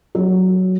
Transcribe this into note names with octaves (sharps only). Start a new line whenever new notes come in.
F#3